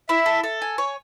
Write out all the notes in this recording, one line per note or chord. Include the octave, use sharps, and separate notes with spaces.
E4 E5
A4
A4
G#5
C#5